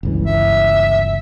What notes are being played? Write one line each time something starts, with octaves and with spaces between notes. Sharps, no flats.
G1 C#2 E3
E5